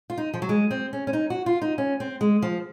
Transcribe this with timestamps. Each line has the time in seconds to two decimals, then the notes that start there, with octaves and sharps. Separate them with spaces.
0.10 F4
0.18 D#4
0.34 F3
0.42 F#3
0.49 G#3
0.71 C4
0.93 C#4
1.07 C#4
1.13 D#4
1.30 F#4
1.46 F4
1.62 D#4
1.78 C#4
2.00 C4
2.21 G#3
2.42 F3